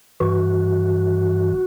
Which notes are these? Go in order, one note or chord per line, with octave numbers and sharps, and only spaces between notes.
G2 E3 F#4